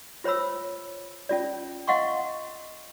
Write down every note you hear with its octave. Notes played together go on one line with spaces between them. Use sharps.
F4 C5 C#5 B5 E6
C#4 F4 D5
D#5 F5 F#5 C6 C#6